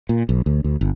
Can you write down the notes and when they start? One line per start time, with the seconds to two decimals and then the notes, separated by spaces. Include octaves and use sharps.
0.09 A#2
0.29 B1
0.46 D2
0.64 D2
0.81 G1